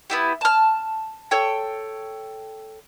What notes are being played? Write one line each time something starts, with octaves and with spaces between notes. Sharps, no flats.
B3 E4 G4
A5 F6
A4 C#5 G5